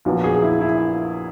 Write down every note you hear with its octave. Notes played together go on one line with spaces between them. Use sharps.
A#1 A#2 F#3 B3
G#4
E4
E4